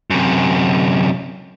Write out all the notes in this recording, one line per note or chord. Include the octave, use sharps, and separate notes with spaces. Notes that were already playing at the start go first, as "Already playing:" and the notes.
F#2 C3